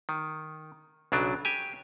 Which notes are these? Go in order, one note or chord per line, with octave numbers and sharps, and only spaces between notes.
D#3
B1 C#3 F#3 D4
G4 G#5